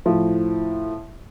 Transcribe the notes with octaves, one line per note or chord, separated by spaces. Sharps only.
A2 F3